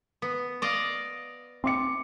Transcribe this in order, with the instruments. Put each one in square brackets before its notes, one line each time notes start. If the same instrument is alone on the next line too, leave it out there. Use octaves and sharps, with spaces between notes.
[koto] B3
D5 D#5 F5
[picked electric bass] C4 [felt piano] C6 D6 C#7